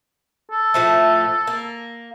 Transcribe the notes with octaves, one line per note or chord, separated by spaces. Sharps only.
A4
A2 F3 A3
A#3